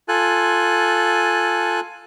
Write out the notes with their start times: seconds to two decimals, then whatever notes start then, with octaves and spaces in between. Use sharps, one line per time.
0.08 F4 A4 G#5 F#6